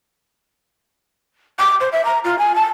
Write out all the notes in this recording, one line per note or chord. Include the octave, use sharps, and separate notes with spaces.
D6
C5
E5
A#5
F4
G#5
A5